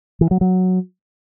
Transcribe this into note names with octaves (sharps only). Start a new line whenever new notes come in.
E3
F#3
F#3